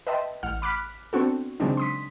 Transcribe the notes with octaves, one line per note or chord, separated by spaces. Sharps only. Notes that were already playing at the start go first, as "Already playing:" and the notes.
B4 D#5 E5 G5 A5 C6
A1 F#5 F6
B5 D6 F6 F#6 B6
B3 C4 D4 F#4 A4
C#3 F#3 G#3 C4 D4 D#4
C6 D#6 B6